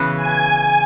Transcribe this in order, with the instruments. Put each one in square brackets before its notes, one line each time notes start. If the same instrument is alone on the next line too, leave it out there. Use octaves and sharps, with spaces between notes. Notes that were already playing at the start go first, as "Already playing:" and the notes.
Already playing: [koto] C#3 E3 B3 F#4 B4
[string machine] G#5